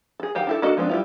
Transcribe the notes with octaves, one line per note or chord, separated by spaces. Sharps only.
G#4 A4
D#3 G4 F5 F#5
D4 E4 A4
A#3 D4 F#4 A4 D#5
F3 G#3 B3 C4 D4
G3 E4 F4